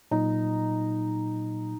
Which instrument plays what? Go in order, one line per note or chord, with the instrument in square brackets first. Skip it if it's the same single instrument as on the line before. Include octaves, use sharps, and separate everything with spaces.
[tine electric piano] A#2 F#3 [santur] D#4